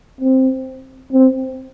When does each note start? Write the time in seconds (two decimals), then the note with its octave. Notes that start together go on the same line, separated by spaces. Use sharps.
0.21 C4
1.13 C4